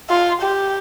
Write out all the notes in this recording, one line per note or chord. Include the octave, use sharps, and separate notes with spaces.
F4
G4